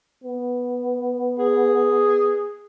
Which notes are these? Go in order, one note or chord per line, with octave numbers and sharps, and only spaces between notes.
B3
G#4